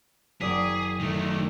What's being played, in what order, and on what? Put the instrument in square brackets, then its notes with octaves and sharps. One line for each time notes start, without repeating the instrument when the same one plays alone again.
[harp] F#1 D5 [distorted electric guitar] G#4 [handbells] D#6 B6
[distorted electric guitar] D#3 A3